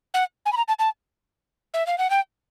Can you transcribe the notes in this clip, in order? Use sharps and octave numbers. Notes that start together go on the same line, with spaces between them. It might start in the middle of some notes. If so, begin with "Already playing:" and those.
F#5
G#5
B5
A#5
A5
A5
E5
F5
F#5
G5